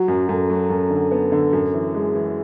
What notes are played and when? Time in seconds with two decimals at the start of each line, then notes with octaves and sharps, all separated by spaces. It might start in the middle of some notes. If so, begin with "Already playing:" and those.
Already playing: F#3 F#4
0.08 F#2
0.29 F#2 A4
0.50 F#3
0.70 F#2
0.90 D3
1.11 B3
1.32 D3
1.53 F#2
1.74 E3
1.95 G#3 G#4
2.15 E3